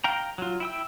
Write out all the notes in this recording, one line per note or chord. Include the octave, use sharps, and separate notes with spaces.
F5 G5 A#5
F#3 F4
E4 G5 E6